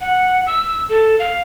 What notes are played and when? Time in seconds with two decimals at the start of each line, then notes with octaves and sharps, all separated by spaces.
0.01 F#5
0.47 E6
0.89 A4
1.19 F5